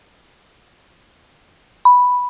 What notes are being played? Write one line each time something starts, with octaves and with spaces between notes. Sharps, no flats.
B5